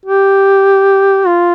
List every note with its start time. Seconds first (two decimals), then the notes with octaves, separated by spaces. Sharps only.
0.06 G4
1.27 F4